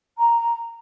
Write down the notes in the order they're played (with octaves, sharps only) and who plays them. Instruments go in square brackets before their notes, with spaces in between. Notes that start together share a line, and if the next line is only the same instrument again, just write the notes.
[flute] A#5